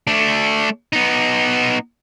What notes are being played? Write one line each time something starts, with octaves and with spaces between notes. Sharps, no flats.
A3 D4
B3 D#4